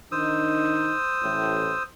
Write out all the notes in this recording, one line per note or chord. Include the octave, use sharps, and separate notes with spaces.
D#3 D4 D#4 C5 D#6 E6
A1 A2